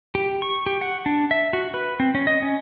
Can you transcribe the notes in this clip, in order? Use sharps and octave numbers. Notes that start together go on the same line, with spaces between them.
G4
C#6
G4
F#5
D4
E5
F#4
B4
C4
C#4
D#5
C#4